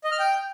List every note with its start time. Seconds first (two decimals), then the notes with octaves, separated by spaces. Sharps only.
0.04 D#5
0.12 F6
0.19 G5